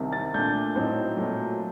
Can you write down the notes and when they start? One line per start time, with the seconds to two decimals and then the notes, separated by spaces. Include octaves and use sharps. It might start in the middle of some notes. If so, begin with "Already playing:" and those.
Already playing: C2 C3 D#3
0.12 A6
0.34 A#2 A3 D4 G6
0.75 A2 F#3 C4 D#4
1.17 A#2 F#3 A3